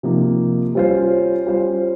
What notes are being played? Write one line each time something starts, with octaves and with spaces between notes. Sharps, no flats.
C3 F3 A#3 D#4
G3 C#4 F4 C5
G3 C#4 F4 C5